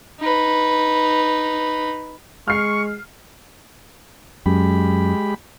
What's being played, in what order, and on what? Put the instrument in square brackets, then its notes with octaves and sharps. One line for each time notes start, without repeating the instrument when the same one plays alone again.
[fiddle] D#4 B4
[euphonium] G#3 [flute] C#6 [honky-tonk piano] F6 C7
[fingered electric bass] F#2 [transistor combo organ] G#3 G4 B5